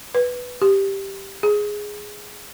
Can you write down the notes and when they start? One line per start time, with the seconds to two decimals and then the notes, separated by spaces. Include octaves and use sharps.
0.15 B4
0.62 G4
1.43 G#4